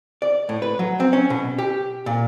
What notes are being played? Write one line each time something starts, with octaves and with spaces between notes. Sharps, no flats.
D5
A2
B4
F#3
C4
C#4
B2
G4
A#2